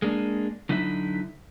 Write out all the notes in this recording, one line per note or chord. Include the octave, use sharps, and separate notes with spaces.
G#3 A#3 D4
D3 F#3 D#4 E4 A#4 E5